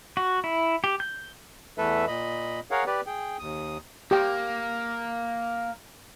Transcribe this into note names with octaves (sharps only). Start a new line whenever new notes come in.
F#4
E4
G4
G6
E2 E3 A3 A4 B4 E5
A#2 D#5 B5
G#4 A#4 C#5 F5 F#5
G4 B4 D5
G#4 G5
D#2 D#6
A#3 G4 G5